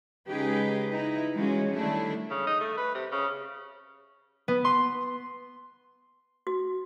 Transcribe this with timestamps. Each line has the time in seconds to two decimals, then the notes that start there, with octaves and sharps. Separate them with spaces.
0.29 C#3 G#3 D#4 G4 G#4 B4
0.91 D#4 E4 B4
1.33 E3 G#3 C#4 F4 F#4
1.71 D3 D#3 G3 A3 D4 E4
2.30 C#3
2.47 D#4
2.61 A3
2.77 B4
2.95 C3
3.12 C#3
4.48 B3
4.65 C6
6.47 F#4